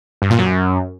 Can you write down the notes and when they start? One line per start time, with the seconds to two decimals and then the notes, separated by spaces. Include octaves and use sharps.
0.22 G2
0.30 A#2
0.39 F#2